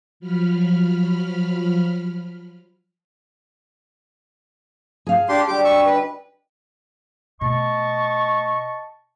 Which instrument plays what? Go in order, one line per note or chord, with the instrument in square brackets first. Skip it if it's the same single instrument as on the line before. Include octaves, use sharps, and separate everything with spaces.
[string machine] F3 F#3 B5 F6
[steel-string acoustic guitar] G#4 F5
[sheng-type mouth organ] D4 G4 C6
[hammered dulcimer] D3 F#3 G3 [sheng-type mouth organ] G4 D6
[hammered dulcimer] G4 [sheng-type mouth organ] C#6 E6
[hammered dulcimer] G#4 D5 D#5 [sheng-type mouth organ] B4
[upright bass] B2 A3 [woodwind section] D#5 A5 C#6